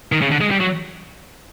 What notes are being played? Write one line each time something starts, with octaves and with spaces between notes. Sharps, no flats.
D#3
C#3
D3
G#3
G3
F#3